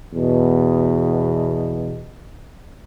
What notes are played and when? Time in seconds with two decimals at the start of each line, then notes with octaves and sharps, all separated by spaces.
0.15 E2 B2